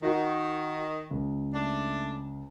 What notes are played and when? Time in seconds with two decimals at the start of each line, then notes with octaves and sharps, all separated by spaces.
0.02 D#3 D#4 F#4
1.11 C#2
1.54 A3 D4